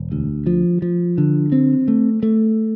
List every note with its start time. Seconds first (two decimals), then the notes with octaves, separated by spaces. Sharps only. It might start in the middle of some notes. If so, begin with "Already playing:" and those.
Already playing: E1
0.12 D2
0.46 F3
0.82 F3
1.18 D3
1.52 C4
1.88 A3
2.23 A3